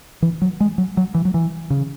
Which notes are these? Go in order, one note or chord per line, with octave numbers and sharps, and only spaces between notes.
E3
F#3
G#3
F#3
F#3
E3
F#3
E3
C#3